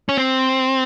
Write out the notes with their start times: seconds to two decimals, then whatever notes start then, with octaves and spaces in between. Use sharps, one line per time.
0.09 C#4
0.17 C4